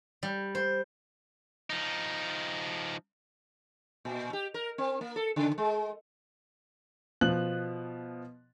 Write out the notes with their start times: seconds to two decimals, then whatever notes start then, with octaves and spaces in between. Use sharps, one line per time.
0.23 G3
0.55 C5
1.70 F3 D#4
4.05 A#2
4.33 G4
4.54 A#4
4.78 C4
5.01 A#3
5.16 A4
5.36 C#3
5.58 G#3
7.21 B2 F3 F#6 F#7